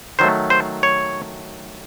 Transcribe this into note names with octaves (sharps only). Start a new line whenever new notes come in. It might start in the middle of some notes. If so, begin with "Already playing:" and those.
D#3 F#3 A3 C5
C5
C#5